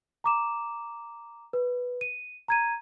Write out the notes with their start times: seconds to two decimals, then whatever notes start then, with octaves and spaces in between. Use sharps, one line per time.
0.24 A#5 D6 E7
1.53 B4
2.01 D#7
2.48 A#5 G#6 D#7